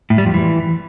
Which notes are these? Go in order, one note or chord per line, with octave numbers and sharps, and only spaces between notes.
A2
G3
F2
E3